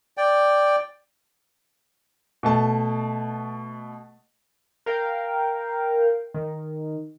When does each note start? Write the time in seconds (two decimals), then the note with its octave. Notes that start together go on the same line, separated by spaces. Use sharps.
0.17 D5 G5
2.43 B2 A3 A5
4.86 A#4 F5 G5
6.34 D#3